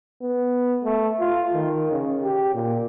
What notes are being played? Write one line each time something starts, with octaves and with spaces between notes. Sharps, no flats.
B3
A3
F4
D#3
C#3
G4
A#2